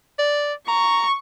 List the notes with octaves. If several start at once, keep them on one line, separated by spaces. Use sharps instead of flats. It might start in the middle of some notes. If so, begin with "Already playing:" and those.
D5
A#5 C#6